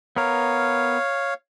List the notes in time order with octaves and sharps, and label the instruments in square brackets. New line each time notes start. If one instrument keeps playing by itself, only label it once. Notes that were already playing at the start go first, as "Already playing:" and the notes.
[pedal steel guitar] B3 A#4 [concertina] C#5 F5